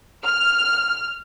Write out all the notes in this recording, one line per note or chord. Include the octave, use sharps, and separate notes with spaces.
F6